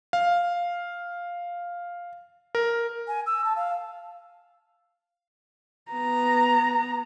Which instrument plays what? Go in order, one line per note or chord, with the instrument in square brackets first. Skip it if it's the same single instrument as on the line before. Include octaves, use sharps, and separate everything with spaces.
[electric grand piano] F5
A#4
[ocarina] G#5
E6
A5
F5
[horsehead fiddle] B3 A#5